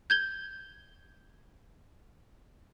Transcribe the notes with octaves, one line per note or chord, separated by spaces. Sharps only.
G6 G#6 G7